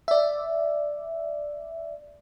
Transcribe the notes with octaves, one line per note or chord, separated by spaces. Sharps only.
D5 E5